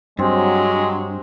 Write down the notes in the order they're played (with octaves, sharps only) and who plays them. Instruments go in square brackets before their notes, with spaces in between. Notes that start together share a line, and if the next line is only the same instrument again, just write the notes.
[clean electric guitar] G2 [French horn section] F#3 [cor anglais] G#3 [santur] C4 G4